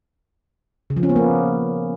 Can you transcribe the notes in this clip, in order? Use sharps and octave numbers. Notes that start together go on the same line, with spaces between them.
C#3
F3
C#4
B3
A#3